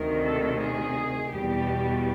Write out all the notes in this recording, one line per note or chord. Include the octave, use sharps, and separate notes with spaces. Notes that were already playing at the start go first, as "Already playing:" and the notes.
Already playing: D2 C3 D#3 A#4
A4
G#4
E2 B2 G3 G4